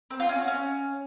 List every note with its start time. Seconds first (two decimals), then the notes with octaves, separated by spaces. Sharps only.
0.10 C4
0.20 F4
0.29 C#4
0.38 F#4
0.47 C#4